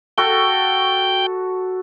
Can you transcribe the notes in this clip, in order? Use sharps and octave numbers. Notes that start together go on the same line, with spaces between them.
F#4 A4 G5 C#6